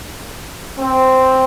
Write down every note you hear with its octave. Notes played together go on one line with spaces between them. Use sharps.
C4